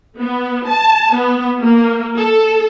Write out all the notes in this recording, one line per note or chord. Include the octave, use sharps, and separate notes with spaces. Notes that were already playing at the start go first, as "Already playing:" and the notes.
B3
A5
B3
A#3
A4